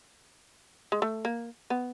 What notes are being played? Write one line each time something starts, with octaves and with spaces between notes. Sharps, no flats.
G#3
A3
A#3
B3